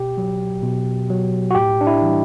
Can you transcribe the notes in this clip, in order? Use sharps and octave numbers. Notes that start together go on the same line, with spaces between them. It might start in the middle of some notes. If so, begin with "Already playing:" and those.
Already playing: B2 G4
F#3
B2
F#3
F#4
A2 G4
D4
E4
E3 G3